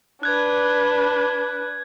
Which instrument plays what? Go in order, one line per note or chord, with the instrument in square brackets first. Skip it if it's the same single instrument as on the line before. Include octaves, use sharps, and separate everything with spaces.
[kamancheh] D4 B4 [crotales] F#6 G#6